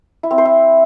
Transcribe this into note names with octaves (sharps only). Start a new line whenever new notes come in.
E4
C4
C5
E4